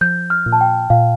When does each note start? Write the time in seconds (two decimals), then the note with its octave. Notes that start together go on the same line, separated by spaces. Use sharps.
0.01 F3 G6
0.30 F6
0.46 A#2
0.52 A5
0.61 G5
0.90 A#2 F5